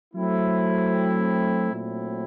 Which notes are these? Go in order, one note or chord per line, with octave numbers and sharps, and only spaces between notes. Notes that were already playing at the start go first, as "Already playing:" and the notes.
F#3 A3 C4 E4
A#2 F#3 A3 C4 E4